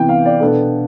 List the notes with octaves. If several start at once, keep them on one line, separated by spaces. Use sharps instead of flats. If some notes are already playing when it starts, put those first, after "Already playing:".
Already playing: C3 E3 B3 G5
F5
D5
B2 B3 D4 A4